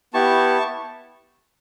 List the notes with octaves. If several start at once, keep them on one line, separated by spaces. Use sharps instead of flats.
B3 E4 G4 A5 C#6